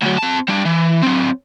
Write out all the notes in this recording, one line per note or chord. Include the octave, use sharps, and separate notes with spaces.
D2 F#3
C4 A5
G3 D4
E3
F#3 C4